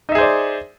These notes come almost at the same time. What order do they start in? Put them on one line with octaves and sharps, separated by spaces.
D#4 E5 G#4 C5 D5